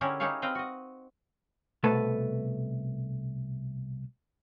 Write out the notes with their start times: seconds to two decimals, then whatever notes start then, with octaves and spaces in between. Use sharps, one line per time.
0.01 D3 C#4 E4 G4 G#4 A#4
0.20 D#4 E4 G4 G#4 C#5 F5
0.42 C4 B4 C5 D#5 F5 G5
0.55 F#4 D#5
1.83 C2 B2 A3 A4 B4 A5